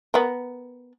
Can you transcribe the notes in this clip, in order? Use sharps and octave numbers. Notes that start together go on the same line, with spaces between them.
B3 A#4